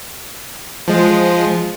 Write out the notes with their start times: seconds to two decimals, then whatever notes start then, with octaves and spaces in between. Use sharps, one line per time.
0.88 F3 G#3